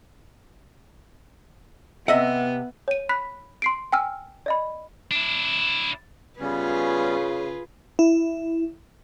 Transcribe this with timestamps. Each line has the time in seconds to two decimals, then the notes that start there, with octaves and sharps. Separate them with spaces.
2.08 C3 B3 D#5 E5 F#5
2.88 C#5 D#7
3.09 B5 F#6 B6
3.62 C6 C7 D7
3.92 G5 G#5 E6 F6
4.46 D5 D#5 B5
5.11 D4 E4
6.40 C#3 G3 B3 C#4 F4 G#4 B4
7.99 E4